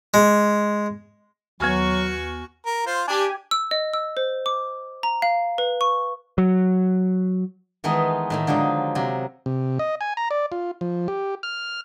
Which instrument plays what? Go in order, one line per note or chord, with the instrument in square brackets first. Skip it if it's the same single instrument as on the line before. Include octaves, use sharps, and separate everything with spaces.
[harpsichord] G#3
[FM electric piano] D#2 B3 [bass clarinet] F#3 [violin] F#4 C#6 [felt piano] G#5 F6 G#6
[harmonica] A#4
F4 C5
[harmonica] D4 [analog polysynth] G4 G#5
[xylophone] E6
D#5
E6
C5
D6
A#5
F5
B4
C#6
[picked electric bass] F#3
[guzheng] D#3 E3 G#3 A3 B3 D#4
A2 D#3 A3
D3 F3 F#3 G#3 D#4
C3 F#3
[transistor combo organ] C3
D#5
G#5
A#5
D5
F4
F3
G4
F6